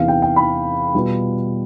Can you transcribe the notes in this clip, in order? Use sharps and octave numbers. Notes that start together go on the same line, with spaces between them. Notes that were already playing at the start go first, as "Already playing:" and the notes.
Already playing: E2 C3 E3 F5
G5
G5
B5
B2 G3 B3 F4